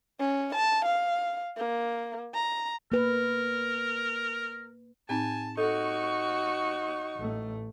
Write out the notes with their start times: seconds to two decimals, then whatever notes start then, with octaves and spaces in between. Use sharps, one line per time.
0.19 C#4
0.55 A5
0.86 F5
1.57 A#3
2.34 A#5
2.92 A#3 A#4 B4
5.09 A2 C4 D#4 G#5 A5
5.58 D#4 F#4 A4 C#6
7.17 A1 A3